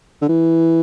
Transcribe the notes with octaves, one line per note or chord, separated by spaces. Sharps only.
D3
E3